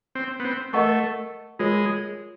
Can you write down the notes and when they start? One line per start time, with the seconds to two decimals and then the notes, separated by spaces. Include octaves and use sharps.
0.15 C4
0.40 B3
0.45 C4
0.73 A3 A#4 D#5 F#5 A5 C#6
1.59 G#3 F4 A#4 C#5